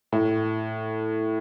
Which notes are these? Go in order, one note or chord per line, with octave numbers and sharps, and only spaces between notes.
A2